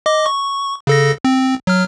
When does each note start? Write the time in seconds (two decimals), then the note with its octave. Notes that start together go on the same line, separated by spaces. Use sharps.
0.06 D#5 D6
0.26 C#6
0.87 C#3 A4 A#6
1.25 C4
1.67 F#3 F6